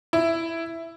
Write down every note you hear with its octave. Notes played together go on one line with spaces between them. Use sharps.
E4